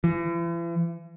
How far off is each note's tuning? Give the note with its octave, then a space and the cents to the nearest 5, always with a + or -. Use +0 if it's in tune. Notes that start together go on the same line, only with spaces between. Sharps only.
E3 +45